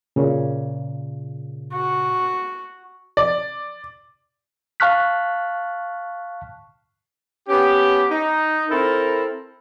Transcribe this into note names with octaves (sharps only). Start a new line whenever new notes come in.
A#2 C#3
F#4
D5
F5 A5 C#6 F6 F#6 B6
B3 C#4 G4
D#4
C4 E4 A4 A#4